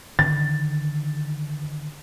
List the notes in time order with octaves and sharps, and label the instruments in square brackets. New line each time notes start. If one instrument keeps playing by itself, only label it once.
[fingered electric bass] D3 D#3 [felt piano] A6